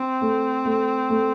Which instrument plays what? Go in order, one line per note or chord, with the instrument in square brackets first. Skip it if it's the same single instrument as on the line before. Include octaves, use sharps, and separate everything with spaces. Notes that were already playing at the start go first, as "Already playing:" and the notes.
Already playing: [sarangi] C4
[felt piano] A3
A3
A3